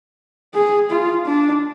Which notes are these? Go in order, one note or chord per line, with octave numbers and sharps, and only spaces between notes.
G#4
F4
D4